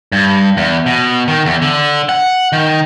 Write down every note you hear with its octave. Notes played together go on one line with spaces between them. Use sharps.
G2
E2
B2
D#3
E2
D3
F#5
D#3